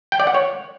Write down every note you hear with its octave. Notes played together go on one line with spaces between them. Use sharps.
G5
D5
F#5
C#5